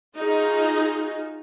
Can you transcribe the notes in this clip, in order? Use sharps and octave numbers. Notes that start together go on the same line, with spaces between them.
D#4 F4 F#4 G#4